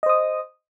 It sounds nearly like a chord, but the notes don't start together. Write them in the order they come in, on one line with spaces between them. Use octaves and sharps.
D#5 C5 D#6